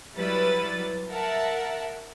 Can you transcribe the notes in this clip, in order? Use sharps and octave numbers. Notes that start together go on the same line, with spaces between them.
F#3 G3 E4 B4 A6
A#4 E5 F#5 A5